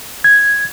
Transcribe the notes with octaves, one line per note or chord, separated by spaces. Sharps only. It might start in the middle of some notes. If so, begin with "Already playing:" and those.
G#6